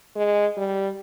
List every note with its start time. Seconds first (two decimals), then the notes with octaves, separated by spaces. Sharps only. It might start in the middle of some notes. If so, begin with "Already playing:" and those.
0.16 G#3
0.57 G3